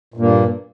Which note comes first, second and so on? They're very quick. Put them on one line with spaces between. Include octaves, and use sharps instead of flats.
A#2 G2 A#3